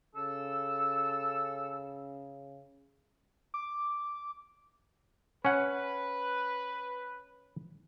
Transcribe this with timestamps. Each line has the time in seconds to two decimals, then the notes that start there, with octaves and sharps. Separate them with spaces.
0.16 C#3 A4 E6
3.54 D6
5.45 C#4 B4 F#5